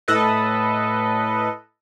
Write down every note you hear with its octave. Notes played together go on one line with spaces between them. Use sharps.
A2 A4 B4 D#5